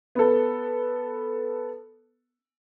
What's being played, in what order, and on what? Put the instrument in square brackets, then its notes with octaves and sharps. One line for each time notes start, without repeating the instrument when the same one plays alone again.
[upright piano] B3 A4